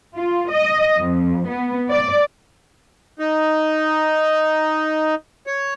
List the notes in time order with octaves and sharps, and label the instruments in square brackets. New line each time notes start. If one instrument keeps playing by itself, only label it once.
[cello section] F4
D#5
F2
B3
D5
[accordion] D#4
C#5